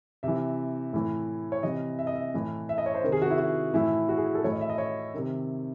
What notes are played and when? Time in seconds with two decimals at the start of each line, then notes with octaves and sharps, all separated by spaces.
0.23 C3 E3 E5
0.93 A2 E3
1.52 C#5
1.63 C3 E3 D#5
1.99 E5
2.07 D#5
2.15 E5
2.34 A2 E3
2.69 E5
2.78 D#5
2.86 C#5
2.95 C5
3.04 C3 D#3
3.12 G#4
3.22 F#4
3.30 E4
3.38 F#4
3.74 A2 E3 E4
4.09 F#4
4.17 G#4
4.35 A4
4.44 A2 E3 C#5
4.52 D#5
4.61 E5
4.69 D#5
4.78 C#5
5.14 C3 D#3